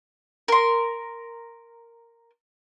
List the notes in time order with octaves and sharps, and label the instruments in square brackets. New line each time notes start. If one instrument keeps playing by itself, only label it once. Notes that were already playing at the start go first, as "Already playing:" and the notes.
[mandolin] A#4 C6